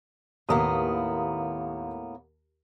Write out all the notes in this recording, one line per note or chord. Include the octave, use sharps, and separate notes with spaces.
D#2 A2 A#3 B3 D#6